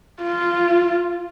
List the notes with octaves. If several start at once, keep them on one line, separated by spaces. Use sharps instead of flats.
F4